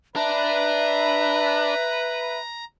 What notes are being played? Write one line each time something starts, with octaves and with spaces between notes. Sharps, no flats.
D4 B4 E5 A#5